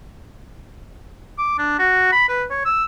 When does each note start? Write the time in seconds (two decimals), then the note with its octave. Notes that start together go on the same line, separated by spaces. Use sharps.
1.38 D6
1.58 D4
1.79 F#4
2.12 B5
2.28 B4
2.50 C#5
2.65 E6